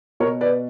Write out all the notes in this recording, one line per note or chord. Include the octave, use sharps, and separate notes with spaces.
B2 A#4 C#5
B4 D5